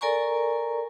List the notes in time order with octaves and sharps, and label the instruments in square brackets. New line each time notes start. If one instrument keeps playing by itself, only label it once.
[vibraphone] A4 A#4 D5 G#5 A#5 C#6